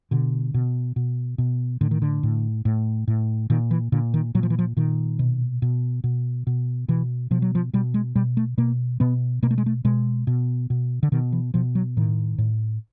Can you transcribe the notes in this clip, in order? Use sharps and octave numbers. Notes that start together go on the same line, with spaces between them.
B2 D3
B2
B2
B2
A2 D3
D#3
D3
A2
A2
A2
A#2 D#3
E3
A#2 D3
D#3
A#2 F#3
F3
E3
F3
A#2 D#3
B2
B2
B2
B2
B2 E3
B2 F3
F#3
F3
B2 G3
G#3
B2 G3
A3
B2 A#3
B2 B3
B2 A#3
A3
G#3
A3
B2 G#3
B2
B2
D3
B2 D#3
E3
B2 F3
F#3
A2 D#3
A2